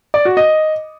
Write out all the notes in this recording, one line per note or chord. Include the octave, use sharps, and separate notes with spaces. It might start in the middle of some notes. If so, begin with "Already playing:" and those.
D5
F#4
D#5